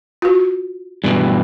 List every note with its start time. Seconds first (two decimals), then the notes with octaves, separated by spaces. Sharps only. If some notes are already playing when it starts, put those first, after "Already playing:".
0.22 F4 F#4
1.04 G2 B2 E3